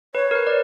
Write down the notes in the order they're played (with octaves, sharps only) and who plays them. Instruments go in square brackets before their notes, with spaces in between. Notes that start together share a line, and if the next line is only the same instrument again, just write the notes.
[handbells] B4 [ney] C#5
[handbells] A#4
B4
D5